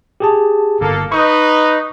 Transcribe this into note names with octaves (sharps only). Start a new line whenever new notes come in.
G4 G#4 A5
G1 A#3 A4
D#4 B4 C#6